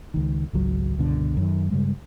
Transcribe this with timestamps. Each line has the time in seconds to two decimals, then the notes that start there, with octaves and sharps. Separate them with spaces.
0.14 C#2 D#3
0.53 G#1 C#2 F#3
0.97 C#2 G2 B2 D3
1.37 F#2 D#3
1.71 G2 C#3 G3 G#3